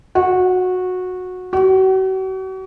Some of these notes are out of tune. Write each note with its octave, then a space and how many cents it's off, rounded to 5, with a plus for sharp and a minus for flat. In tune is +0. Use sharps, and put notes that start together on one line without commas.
F#4 -15
F#4 +40